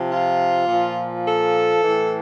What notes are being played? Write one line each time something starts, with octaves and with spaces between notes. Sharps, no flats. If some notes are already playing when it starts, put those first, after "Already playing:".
Already playing: C3 F3
F4
A#2
F3
A4
A2 E3